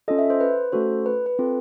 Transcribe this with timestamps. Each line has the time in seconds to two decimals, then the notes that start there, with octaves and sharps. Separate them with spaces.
0.08 C#4 F4 A4 D#5
0.19 E5
0.30 C5
0.40 B4
0.72 A3 C#4 F#4 A4 C5
1.06 B4
1.26 B4
1.39 C4 F4 A4